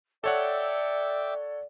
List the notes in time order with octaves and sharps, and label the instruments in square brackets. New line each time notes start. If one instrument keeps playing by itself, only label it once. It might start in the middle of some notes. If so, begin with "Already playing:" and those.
[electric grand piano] A4 C#5 F#5 [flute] D5 [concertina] E5 G5 D6